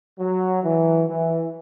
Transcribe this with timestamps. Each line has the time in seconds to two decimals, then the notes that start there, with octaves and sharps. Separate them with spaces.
0.19 F#3
0.63 E3
1.07 E3